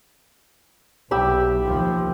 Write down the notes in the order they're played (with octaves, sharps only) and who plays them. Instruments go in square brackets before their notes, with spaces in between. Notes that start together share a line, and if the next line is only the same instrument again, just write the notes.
[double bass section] B1 [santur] G4 E5 B5
[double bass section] D#2 F3